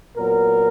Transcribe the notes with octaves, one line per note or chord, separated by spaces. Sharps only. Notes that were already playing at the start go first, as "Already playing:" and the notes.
A#2 F#3 B3 A#4